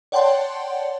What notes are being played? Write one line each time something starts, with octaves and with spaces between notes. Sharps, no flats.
C#5 D5 F#5 G5 A5 C6